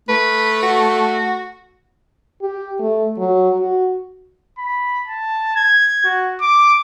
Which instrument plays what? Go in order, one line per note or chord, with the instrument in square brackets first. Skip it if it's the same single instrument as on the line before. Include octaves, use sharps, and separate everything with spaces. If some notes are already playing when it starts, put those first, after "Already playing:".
[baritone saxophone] A3 [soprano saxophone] B4
[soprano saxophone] F#4
[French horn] G4
A3
F#3
F#4
[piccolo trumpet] B5
A5
G#6
F#4
D6